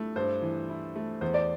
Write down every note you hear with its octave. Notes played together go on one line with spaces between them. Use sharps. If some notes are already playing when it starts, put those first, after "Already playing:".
Already playing: G2 A3 E4
G2 C5
E3
E4
A3
E2 C5
D5